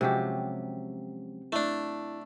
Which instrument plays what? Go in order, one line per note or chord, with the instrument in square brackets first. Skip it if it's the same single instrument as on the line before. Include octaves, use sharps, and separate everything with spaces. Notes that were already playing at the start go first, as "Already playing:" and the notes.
[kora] C3 F#3 G4 [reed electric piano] F3 G#3 C#4
[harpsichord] A3 D4 [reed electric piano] E4